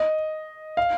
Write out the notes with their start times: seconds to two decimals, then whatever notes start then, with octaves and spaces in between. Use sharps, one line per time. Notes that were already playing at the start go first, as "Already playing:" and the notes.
Already playing: D#5
0.77 F5